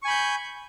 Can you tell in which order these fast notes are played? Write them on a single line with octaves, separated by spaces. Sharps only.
C#6 G#5 B5 G6